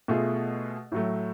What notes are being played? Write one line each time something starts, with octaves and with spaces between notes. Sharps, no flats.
B2 A3 F4 G#4
A2 F#3 A3